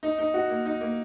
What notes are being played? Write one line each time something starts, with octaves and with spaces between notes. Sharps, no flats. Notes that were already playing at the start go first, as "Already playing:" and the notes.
D#4
D#4
F#4
A#3
D#4
A#3